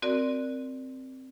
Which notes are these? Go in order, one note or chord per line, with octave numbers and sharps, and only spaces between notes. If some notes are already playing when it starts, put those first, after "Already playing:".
C4 F#4 A#4 D5